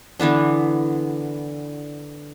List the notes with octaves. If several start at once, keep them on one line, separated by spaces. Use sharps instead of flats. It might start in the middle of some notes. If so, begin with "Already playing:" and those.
D3 E3 B3 D4